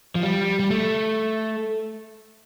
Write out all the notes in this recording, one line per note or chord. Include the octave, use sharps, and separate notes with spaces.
F3
G3
G3
A3